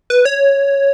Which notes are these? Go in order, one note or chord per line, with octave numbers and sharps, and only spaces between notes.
B4
C#5